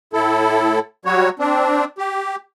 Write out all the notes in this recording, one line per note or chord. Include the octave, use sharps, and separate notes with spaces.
A2 E4 A4
F#3 G3 F#4 C#5
C4 D4
G4